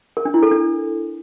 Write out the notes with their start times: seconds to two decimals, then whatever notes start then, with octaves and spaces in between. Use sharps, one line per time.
0.17 A#4
0.25 D4
0.34 E4
0.43 A4
0.51 D4